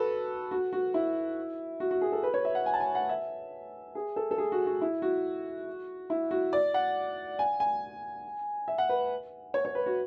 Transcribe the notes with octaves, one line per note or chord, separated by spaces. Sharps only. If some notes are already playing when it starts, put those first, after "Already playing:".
Already playing: F#4 A4 B4
F#4
F#4
E4
F#4
F#4
G#4
A4
B4
C#5
E5
F#5
G#5
A5
G#5
F#5
E5
G#4
A4
A4
G#4
F#4
F#4
E4
F#4
E4
F#4
D5
F#5
G#5
G#5
E5
F#5
B4
C#5
C#5
B4
F#4